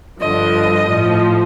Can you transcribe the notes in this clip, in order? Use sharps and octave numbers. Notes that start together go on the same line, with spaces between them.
G2 D3 F3 D#5
A2 F3